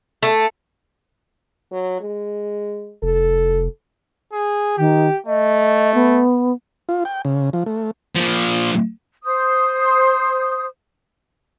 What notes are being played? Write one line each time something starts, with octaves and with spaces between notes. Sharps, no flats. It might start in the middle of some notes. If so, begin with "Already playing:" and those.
A3
F#3
G#3
F1 A4
G#4
D#3 G4
A3 D#5
B3
F4
G5
C#3
F3
A3
A#2 F3
C5 D#6